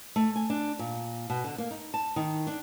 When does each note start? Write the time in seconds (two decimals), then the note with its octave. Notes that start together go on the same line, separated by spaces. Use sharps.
0.16 A3
0.36 G#5
0.50 D4
0.79 A#2
1.30 B2
1.44 D3
1.58 A#3
1.71 D#4
1.94 A5
2.16 D#3
2.47 D4